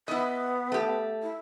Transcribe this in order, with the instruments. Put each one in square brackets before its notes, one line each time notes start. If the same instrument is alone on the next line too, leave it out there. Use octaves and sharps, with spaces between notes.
[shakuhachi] B3 [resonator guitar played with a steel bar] E4 D#5
[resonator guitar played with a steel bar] A3 G4
[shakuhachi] E4